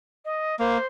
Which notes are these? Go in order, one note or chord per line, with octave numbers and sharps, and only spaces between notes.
D#5
A#3 C5